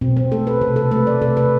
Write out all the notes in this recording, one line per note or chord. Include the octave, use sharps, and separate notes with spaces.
B2 C4
C4
A3 A4
B4
C3 A4
A4
A3 B4
D5
C3 A4
B4